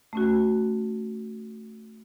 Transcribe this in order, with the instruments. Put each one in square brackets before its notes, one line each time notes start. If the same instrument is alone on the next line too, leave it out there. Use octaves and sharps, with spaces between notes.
[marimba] A3 C#4 F#4